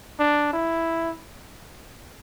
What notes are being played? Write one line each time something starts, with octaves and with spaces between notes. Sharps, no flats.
D4
E4